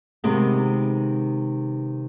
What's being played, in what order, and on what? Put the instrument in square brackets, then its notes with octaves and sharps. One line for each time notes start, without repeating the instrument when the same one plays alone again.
[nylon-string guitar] C3 D#3 G#3 B3